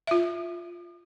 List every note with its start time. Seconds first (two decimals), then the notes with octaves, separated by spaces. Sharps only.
0.07 F4 E5